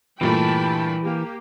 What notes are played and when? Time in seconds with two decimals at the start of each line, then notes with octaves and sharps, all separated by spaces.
0.21 G2 A#2 E3 A3 G5 A5 B5
1.03 A#3 G4